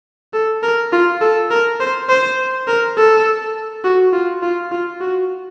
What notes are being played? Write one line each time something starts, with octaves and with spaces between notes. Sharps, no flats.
A4
A#4
F4
A4
A#4
C5
C5
A#4
A4
F#4
F4
F4
F4
F#4